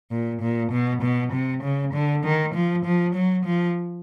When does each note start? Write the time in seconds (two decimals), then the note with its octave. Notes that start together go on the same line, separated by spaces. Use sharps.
0.11 A#2
0.41 A#2
0.72 B2
1.02 B2
1.33 C3
1.63 C#3
1.94 D3
2.24 D#3
2.54 F3
2.85 F3
3.15 F#3
3.45 F3